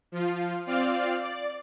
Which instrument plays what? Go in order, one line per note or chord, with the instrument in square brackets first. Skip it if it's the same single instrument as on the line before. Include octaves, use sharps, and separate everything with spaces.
[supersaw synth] F3 F4
C4 F4 D5 F5
D5